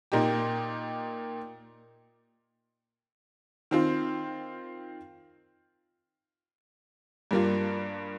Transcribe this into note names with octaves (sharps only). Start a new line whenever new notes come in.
A#2 A#3 D#4 G4
D#3 C4 F4
G2 G3 A#3 F4